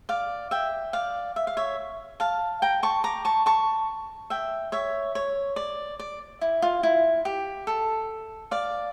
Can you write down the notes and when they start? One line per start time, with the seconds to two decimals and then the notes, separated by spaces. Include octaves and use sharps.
0.09 D5 F5
0.51 E5 G5
0.93 D5 F5
1.36 E5
1.47 F5
1.57 C#5 E5
2.20 F5 A5
2.62 G5 A#5
2.83 A5 C#6
3.04 A#5 D6
3.25 A5 C#6
3.46 A5 C#6
4.30 E5 G5
4.72 C#5 E5
5.15 C#5
5.56 D5
5.99 D5
6.41 E4
6.62 F4
6.83 E4
7.25 G4
7.67 A4
8.51 D5 F5